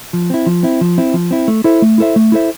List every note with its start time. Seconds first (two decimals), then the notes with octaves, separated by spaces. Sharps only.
0.13 F3
0.30 C4 E4
0.46 F3
0.63 C4 E4
0.81 F3
0.98 C4 E4
1.14 F3
1.31 C4 E4
1.48 A3
1.64 E4 A4 C5 E5
1.82 A3
1.98 E4 A4 C5 E5
2.16 A3
2.32 E4 A4 C5 E5